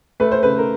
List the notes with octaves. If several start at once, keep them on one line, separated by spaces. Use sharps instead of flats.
A3 B4
C5
C#3 B4
A#4